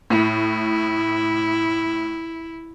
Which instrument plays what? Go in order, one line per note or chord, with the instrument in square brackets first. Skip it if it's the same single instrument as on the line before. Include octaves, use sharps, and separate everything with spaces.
[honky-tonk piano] A2 [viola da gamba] E4